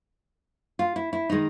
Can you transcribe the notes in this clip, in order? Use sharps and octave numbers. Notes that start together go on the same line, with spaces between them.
F4
E4
E4
D#3 G#3 D#4